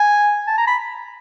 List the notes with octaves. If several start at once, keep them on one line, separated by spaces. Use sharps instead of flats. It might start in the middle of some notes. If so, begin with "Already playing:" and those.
Already playing: G#5
A5
A#5
B5